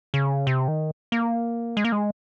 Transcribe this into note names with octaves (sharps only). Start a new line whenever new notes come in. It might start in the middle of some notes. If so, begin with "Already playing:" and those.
C#3
C3
D#3
A#3
G#3
A#3
G#3